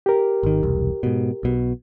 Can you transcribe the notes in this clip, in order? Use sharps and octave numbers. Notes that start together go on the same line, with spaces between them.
G4 A#4
G#1 D#3
E1 C2
G#2 B2
B1 B2